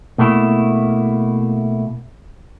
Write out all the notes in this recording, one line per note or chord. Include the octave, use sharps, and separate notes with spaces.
B2 A3 A#3 E4